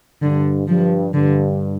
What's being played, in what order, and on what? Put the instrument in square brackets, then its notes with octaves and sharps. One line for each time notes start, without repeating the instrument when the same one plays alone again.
[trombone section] G2 [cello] D3
[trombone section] G2 [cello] F3
[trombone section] G2 [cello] D3